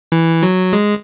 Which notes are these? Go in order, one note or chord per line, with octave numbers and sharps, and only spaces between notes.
E3
F#3
G#3